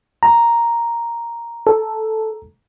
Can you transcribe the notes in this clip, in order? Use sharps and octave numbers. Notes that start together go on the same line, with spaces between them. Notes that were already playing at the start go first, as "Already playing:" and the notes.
A#5
A4